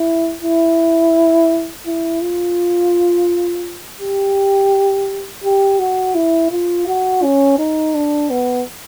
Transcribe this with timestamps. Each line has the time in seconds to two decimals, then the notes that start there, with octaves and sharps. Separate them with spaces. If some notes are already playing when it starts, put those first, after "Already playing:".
Already playing: E4
0.43 E4
1.86 E4
2.21 F4
4.01 G4
5.44 G4
5.79 F#4
6.15 E4
6.51 F4
6.87 F#4
7.23 C#4
7.59 D#4
7.94 D4
8.30 B3